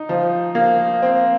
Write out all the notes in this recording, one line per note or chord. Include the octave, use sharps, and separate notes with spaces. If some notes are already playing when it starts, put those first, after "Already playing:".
Already playing: D#4
F3
A#3
C4